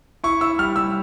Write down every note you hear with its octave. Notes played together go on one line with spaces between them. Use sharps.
E4 C#6
E4 E6
G3 F6
G3 E6